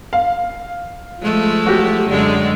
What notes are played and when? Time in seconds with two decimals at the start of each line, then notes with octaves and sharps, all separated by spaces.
0.13 F5
1.21 F3 G#3 A3
1.65 F#3 F#4 G4
2.07 F#2 D3 G#3